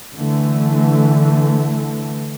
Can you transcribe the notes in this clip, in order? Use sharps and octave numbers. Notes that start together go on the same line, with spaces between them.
D3 E3 A3